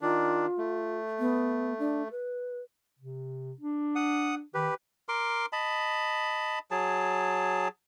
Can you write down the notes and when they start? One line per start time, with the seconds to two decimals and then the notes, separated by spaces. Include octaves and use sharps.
0.01 D#3 D4 F4
0.58 A3
1.19 B3
1.79 D4
2.11 B4
2.99 C3
3.61 D4
3.95 F#5 D#6
4.54 D#3 G4 B4
5.09 A#4 C6 D6
5.53 D#5 A5 B5
6.71 F#3 G#4 A5